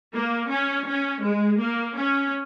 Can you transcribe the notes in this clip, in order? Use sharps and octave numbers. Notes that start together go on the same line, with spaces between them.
A#3
C#4
C#4
G#3
A#3
C#4